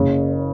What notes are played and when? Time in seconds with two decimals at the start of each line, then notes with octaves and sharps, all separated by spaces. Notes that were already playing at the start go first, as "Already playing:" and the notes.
Already playing: F#1 C#3